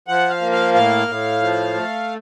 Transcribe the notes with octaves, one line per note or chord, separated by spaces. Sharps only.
F3 F#5
F5
A#3
F5
A2 F5
A2
F3
A3